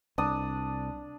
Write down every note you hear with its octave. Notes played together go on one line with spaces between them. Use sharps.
C2 D4 D#6